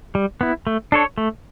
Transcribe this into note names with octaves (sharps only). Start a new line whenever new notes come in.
G3
B3 E4
A3
D4 A4 C#5
A3